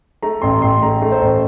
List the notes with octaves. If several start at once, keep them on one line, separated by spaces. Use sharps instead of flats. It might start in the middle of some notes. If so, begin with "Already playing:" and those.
A3 A#5
A1 C6
A1 C6
A3 A#5
A3
C5
A1